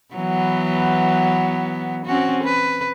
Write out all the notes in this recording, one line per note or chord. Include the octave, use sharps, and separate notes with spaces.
E3 F#3 B3
C4 C#4 F#4
B4